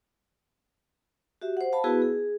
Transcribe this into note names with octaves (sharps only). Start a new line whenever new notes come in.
F#4 G4 E5
C5 F#5
F5 A5 B5
B3 E4 F#4 G#4 B4
G#4